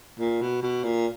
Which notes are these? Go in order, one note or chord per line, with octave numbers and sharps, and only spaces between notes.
A#2
B2
B2
A#2